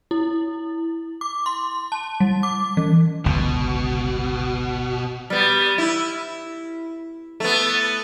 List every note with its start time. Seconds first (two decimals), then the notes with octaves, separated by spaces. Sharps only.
0.11 E4
1.21 D6
1.46 C6
1.92 A5
2.20 G3
2.43 D6
2.77 E3
3.26 G1 C#2 B2
5.30 G3 B3
5.78 E4
7.40 A3 B3